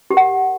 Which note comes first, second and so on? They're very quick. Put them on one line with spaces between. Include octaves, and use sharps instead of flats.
G4 A#4 F#5